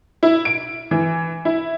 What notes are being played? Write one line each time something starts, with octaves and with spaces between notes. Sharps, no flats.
E4
D7
E3
E4